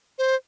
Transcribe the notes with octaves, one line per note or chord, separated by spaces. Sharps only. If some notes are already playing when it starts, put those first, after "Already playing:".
C5